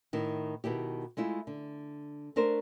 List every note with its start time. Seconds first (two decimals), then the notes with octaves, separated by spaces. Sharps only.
0.13 A2 D#3 E4
0.64 B2 D#3 E4 G4
1.17 G#3 A3 E4 F4
1.47 D3
2.36 A3 D4 A#4 C5